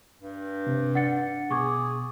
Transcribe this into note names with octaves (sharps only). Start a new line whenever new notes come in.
G2
C3
D4 F#5 A6 C#7
B2 G#4 C#6 D6 G#6